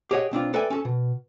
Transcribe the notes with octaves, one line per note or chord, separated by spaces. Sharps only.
G4 G#4 C#5 D#5 F#5
B1 C4 D4 F4
A4 B4 D5 E5 G5 G#5
C#4 F#4 A4
B2